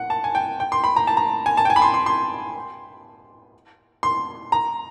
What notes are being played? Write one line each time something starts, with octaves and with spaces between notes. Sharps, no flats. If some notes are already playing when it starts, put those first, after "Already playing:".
Already playing: F#5
A5
G#5
G5
G5
C6
B5
A#5
A5
A#5
G#5
A5
G5
G#5
B5
C6
C6
C6
C6
A#5